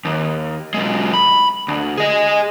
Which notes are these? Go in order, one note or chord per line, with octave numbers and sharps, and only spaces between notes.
D#2
B1 G#3
B5
D2
G#4 D#5